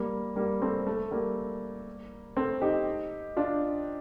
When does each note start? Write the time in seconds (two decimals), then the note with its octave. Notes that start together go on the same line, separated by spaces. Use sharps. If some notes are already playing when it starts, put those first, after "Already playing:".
Already playing: G3 A#3
0.36 G3 A#3
0.62 A3 C4
0.87 A3
1.11 G3 A#3
2.36 A3 C4
2.62 D#4 G4
3.37 D4 F4